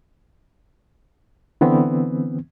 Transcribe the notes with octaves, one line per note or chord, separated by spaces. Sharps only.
D3 E3 B3 C4